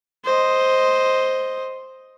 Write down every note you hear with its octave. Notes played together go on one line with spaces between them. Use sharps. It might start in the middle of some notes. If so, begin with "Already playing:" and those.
C5 D#5